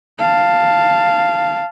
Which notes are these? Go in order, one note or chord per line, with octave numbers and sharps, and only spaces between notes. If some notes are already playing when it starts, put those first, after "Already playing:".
F5 A5